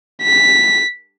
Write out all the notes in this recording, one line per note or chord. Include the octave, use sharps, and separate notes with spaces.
B6